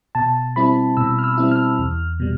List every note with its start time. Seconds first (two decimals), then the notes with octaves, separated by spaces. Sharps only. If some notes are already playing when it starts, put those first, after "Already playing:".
0.15 B2 A5
0.56 G3 C4 E4 B5
0.97 B2 E6
1.19 F6
1.24 E6
1.38 G3 C4 E4
1.52 F6
1.79 E2
2.20 B2 G3